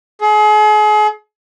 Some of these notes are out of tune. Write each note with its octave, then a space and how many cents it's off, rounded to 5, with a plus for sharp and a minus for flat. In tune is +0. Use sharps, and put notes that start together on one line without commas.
G#4 +35